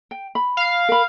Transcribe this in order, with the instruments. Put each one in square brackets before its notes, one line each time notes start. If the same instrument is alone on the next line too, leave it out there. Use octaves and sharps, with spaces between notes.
[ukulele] G5
B5
[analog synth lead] F5
[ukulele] A#4 B5